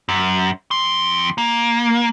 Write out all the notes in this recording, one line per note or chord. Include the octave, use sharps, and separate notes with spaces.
F#2
F2 C6
A#3